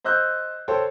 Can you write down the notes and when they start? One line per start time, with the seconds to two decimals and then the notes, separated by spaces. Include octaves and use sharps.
0.04 C5 D#5 E6 F#6 G6
0.68 A4 C5 C#5 G5